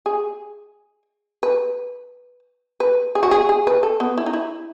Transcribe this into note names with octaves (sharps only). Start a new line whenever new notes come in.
G#4
B4
B4
G#4
F#4
G#4
G#4
B4
A4
B3
E4
D#4
E4